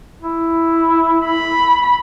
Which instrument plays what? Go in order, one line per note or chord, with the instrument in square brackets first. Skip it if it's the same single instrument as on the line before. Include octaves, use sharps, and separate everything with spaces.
[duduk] E4
[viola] B5